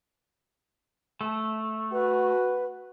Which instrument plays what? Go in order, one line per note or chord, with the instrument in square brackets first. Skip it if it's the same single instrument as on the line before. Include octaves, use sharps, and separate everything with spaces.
[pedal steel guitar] A3
[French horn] F#4 [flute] B4